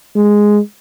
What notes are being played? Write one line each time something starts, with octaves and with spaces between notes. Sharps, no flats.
G#3